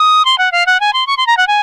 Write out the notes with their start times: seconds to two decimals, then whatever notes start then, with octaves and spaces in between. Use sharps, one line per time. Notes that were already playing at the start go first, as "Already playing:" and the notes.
Already playing: D#6
0.25 C6
0.38 F#5
0.52 F5
0.66 F#5
0.80 G#5
0.93 C6
1.07 C#6
1.17 C6
1.27 A#5
1.37 F#5
1.47 G#5